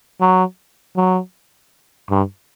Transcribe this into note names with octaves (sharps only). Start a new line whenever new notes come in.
F#3
F#3
G2